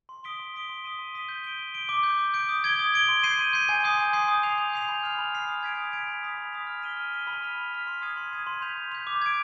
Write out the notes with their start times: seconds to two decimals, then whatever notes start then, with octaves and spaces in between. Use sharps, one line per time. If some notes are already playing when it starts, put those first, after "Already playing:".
0.09 C6
0.24 D#6 B6 D7 G7
0.40 C6
0.54 D#6 B6 D7 G7
0.69 C6
0.84 D#6 B6 D#7 G7
0.99 C6
1.14 D#6 B6 D#7 G7
1.29 G6
1.44 D7 G7
1.59 G6
1.74 D7 G7
1.89 D6
2.03 G6 D7
2.19 D6
2.34 G6 D7
2.49 D#6
2.64 G#6 D7 G7
2.79 D#6
2.94 G#6 D7 G7
3.09 C6
3.23 G6 C7 D#7
3.39 C6
3.53 G6 C7 D#7
3.69 G#5
3.83 C6 D#6 G6 C7
3.99 G#5
4.13 C6 D#6 G6 C7
4.28 D#6
4.43 G6 C7 F7
4.58 D#6
4.73 G6 C7 F7
4.88 B5
5.03 F6 C7 F7
5.18 B5
5.33 F6 C7 F7
5.48 D#6
5.63 G#6 B6 D7 F7
5.78 D#6
5.92 G#6 B6 D7 F7
6.07 B5
6.23 D#6 B6 F7
6.38 B5
6.53 D#6 B6 F7
6.67 F6
6.82 B6 D#7 G7
6.97 F6
7.12 B6 D#7 G7
7.27 B5
7.42 F6 B6 F7
7.57 B5
7.72 F6 B6 F7
7.87 C6
8.02 D#6 G#6 C7 D#7
8.17 C6
8.32 D#6 G#6 C7 D#7
8.47 C6
8.62 G6 B6 F7
8.77 C6
8.92 G6 B6 F7
9.07 D6
9.22 G#6 D7